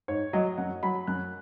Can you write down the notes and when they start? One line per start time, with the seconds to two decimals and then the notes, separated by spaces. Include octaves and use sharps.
0.08 G#2 C#5
0.33 F#3 D#5
0.58 F#2 F#5
0.83 F#3 B5
1.07 F#2 F#6